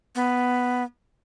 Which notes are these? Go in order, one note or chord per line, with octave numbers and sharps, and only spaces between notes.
B3